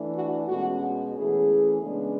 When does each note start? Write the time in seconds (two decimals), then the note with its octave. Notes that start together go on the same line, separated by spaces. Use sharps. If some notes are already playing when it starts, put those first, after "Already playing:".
Already playing: E3 A3 D4
0.15 F#4
0.48 B2 G#3 C#4 F#4
1.14 E3 A3 C#4 G#4
1.80 C#3 G#3 B3 D4